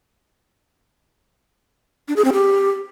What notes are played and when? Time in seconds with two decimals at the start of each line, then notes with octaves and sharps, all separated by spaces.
2.08 D4
2.16 G#4
2.25 C4
2.33 G4